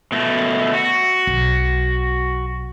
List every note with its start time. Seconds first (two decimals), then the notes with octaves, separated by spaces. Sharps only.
0.12 B2 A3
0.73 F#4
1.27 B1